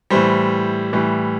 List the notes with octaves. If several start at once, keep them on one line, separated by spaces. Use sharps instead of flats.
A2 E3 G3 C5
A2 E3 G3